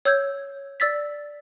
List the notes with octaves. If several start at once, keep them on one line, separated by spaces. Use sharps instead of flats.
C#5 E6 G6 G#6
D5 E6 A6 B6